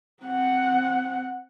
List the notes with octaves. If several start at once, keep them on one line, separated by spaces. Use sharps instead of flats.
C4 F#5